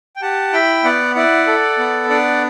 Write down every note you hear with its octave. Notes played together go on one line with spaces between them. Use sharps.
G5
G4 F#5 A5
E4 G5 B5
B3 D5 F#5
E4 D5 F#5
A4
B3
D4 D5 F#5